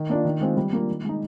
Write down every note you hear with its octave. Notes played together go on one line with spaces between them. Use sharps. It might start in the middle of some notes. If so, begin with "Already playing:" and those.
Already playing: D#3
A#3 D4 F4
D#3
G#3 C4 F4
G3
A#3 D4 F4
D#3
G#3 D#4